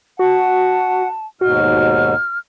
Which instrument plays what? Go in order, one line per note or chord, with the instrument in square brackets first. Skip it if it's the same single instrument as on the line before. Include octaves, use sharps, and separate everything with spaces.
[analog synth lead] F#4 [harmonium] F#5 [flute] A5
[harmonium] D#2 G#2 B2 [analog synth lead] F#4 [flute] F6